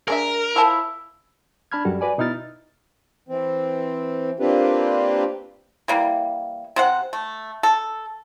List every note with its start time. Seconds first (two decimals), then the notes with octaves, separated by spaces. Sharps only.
0.08 G#3 D4 A#4 E5
0.56 F3 E4 A5
1.72 D4 A5 B5 F6 G#6
1.85 F#2 G3 F#4 A4
2.01 F#4 B4 D5 G#5
2.18 B2 D#4 E4 F6 A6
3.29 E3 C4
4.40 A#3 C4 D4 F4 G4 B4
5.88 E3 G3 A#3
6.76 C3 C5 F#5
7.13 A3
7.63 A4